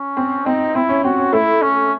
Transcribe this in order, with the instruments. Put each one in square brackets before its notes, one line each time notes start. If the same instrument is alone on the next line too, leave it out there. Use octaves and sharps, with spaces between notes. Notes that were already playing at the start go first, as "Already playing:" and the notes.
Already playing: [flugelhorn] C#4
[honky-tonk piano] C4
[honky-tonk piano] C4 [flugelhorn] D#4
[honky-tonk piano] C4 [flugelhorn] E4
[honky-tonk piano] C#4
[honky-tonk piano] C4 [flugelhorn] F#4
[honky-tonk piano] C#4
[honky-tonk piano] A3 [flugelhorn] E4
[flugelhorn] C#4